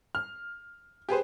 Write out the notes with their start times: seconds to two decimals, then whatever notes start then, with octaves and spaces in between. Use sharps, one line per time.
0.15 F6
1.09 G4 G#4 B4 C5